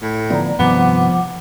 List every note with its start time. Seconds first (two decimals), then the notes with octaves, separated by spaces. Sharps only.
0.02 A2
0.30 D3 F3 B3 D5 A#5
0.59 G2 C3 D#3 F3 B3 F#5 D6